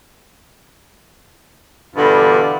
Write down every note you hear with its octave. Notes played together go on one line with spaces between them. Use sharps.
G2 B2 D3 E3 F4